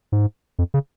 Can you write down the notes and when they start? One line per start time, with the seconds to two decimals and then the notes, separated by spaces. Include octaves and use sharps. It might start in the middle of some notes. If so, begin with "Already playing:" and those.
0.12 G#2
0.59 F2
0.74 C#3